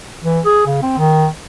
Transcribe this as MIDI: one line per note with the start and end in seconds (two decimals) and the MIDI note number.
0.23 0.40 52
0.45 0.65 68
0.67 0.80 49
0.82 0.95 60
0.98 1.27 51